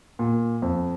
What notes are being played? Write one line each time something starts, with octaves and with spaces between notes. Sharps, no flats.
A#2
F2